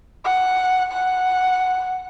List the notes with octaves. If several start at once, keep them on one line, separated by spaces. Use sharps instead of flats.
F#5
F#5